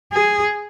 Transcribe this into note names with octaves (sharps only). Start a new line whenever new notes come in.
G#4